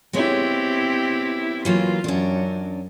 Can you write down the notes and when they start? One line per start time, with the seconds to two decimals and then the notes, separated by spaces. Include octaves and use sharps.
0.13 G#3 B3 C4 E4 G4 C#5
1.65 E3 F#3 A#3 F4
2.04 F#2 C#4 D4